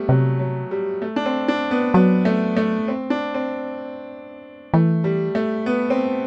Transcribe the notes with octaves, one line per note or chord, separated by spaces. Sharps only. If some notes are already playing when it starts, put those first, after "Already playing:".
Already playing: G3 A3 B3
C3 F#3
F#3
G3
A3
D4
C4
D4
B3
F#3 B3
A3
A3
C4
D4
C4
E3 A3
G3
A3
B3
C4